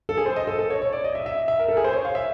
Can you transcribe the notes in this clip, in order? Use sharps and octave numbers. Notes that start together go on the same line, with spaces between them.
A4
G#4
C5
D#5
A4
A4
C#5
C#5
D5
D#5
E5
E5
E5
A#4
A4
G#4
C5
C#5
F5
E5